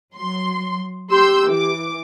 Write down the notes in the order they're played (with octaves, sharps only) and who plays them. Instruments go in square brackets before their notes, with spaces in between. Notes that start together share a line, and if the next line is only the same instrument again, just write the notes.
[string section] F#3 C6
[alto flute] G4 [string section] C6 E6 G6
[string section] E3 D6